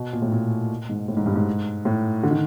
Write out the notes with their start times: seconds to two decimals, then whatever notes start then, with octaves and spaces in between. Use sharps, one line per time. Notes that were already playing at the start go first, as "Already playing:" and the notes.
Already playing: B2
0.13 A#2
0.22 A2
0.32 A#2
0.89 G#2
1.08 A2
1.17 G#2
1.26 G2
1.36 G#2
1.85 A2
2.23 D3
2.31 D#3